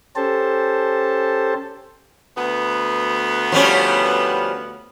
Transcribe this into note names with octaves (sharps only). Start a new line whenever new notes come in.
C#4 G4 A4 C5 A5
D2 B3
F3 G3 C#4